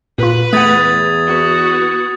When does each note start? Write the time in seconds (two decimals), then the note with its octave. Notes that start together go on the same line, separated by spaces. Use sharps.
0.18 A#2 F4 B4
0.53 E2 A3 F#5 D#6 G#6 A6
1.27 B3 F#4